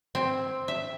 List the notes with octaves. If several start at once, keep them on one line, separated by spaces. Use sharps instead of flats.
C4
E5